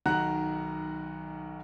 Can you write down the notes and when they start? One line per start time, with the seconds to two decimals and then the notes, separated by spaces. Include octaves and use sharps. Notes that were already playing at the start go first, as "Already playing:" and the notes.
0.06 B1 D#3 F#4 F#5 A#5 F#6